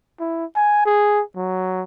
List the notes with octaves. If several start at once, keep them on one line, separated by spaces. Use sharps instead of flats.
E4
G#5
G#4
F#3